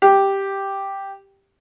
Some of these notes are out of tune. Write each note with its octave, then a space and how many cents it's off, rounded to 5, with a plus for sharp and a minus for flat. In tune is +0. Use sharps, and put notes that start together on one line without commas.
G4 +0